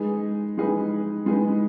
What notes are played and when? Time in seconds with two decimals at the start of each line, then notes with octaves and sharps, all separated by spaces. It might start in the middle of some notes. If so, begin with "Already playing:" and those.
Already playing: G#3 D#4 G#4 B4
0.58 G#3 D#4 G#4 B4
1.26 G#3 D#4 G#4 B4